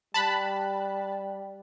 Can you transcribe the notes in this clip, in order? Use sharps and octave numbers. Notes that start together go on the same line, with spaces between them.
G3 A5 B5 F#6